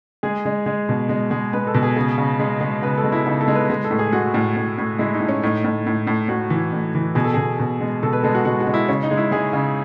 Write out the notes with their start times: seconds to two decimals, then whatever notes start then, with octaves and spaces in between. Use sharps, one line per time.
0.23 G#3 G#4
0.46 G#3
0.66 G#3
0.89 B2
1.09 G#3
1.31 G#3
1.53 G#3 B4
1.67 A4
1.74 B2
1.83 G#4
1.96 C#3 G#4
2.18 C#3
2.40 G#3
2.61 G#3
2.82 C#3 B4
2.98 A4
3.04 G#3
3.12 E4
3.26 C#3 D#4
3.41 A4
3.48 G#3
3.55 B4
3.69 G#3 B4
3.84 A4
3.91 A2
3.99 G#4
4.13 G#3 F#4
4.34 A2
4.57 A2
4.78 A2
4.99 G#3 E4
5.14 D#4
5.20 A2
5.29 C#4
5.43 A2 D#4
5.64 A2
5.86 A2
6.07 A2
6.29 A2 F#4
6.50 E3
6.73 A2
6.95 E3
7.15 B2 G#4
7.24 A4
7.34 B2 G#4
7.60 B2
7.81 G#3
8.03 B2 A4
8.13 B4
8.24 G#3 A4
8.35 F#4
8.45 G#3 F#4
8.60 F#4
8.67 G#3
8.74 E4
8.88 C#3 C#4
9.03 D#4
9.11 G#3
9.17 E4
9.31 G#3 G#4
9.53 C#3